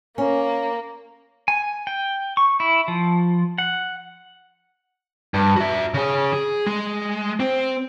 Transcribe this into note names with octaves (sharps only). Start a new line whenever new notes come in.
A#3 C#4
G#5
G5
C#6
E4
F3
F#5
G2
F#4 E5
C#3 G#4
G#4
G#3
C4